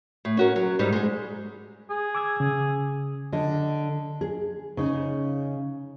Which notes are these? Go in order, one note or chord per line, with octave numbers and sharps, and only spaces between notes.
A2
C#4 F#4 A#4
F#3
G#2 G3 D#4
G#3 G#4
G#4
D6 E6 G#6
C#3
D3 D#5
G#4
C#3 D#4